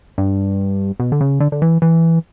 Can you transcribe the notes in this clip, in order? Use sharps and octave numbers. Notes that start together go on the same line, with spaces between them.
G2
B2
D3
C#3
D3
D3
E3
E3